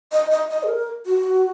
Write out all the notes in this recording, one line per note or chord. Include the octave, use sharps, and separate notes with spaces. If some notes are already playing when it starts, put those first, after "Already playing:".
D#5
D#5
D#5
G#4
A#4
F#4